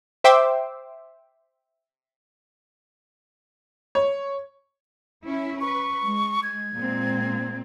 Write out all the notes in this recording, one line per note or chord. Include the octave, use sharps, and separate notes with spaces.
C5 E5 G5 C6 D6 E6
C#5
C#4 E4
B4 C#6
G#3
G#6
A#2 G#3 C4